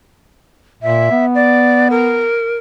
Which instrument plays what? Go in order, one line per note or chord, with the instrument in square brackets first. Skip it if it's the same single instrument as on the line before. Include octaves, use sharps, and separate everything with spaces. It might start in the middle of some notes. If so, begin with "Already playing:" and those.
[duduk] A#2 [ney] E5
[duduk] B3
[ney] D5
A#4